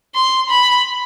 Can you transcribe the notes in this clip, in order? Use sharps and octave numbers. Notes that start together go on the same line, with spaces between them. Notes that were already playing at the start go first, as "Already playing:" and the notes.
C6
B5